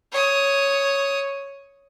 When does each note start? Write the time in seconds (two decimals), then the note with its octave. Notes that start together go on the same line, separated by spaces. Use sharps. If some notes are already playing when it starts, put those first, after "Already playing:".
0.12 C#5 D#6